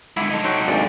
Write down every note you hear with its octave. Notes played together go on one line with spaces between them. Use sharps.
G#2 D3 E4
D#4 A4
F#3 C5 G5
G#1 D2 D5